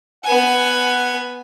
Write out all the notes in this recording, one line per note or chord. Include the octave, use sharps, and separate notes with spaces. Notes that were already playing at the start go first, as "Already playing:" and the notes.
B3 F#5 G#5